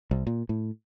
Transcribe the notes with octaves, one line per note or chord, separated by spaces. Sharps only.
C2
A#2
A2